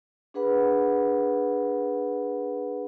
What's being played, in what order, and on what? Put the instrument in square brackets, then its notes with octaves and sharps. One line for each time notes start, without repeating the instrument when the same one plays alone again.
[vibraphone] D4 G#4 B4 F#5 B5